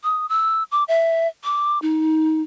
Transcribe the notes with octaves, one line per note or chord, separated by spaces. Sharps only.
D#6
E6
D6
E5
D6
D#4